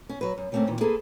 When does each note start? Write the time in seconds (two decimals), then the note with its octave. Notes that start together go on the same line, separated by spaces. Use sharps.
0.09 C#4
0.21 F#3 B4
0.38 F#2
0.52 C#3 G3 A3 A#3 C4 C#4
0.67 A#2 D#3 E3
0.81 A#3 G#4 A4 B4